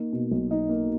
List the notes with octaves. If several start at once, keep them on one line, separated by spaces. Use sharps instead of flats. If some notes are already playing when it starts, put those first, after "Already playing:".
Already playing: A#3 D#4
B2
B1
D#4
A#3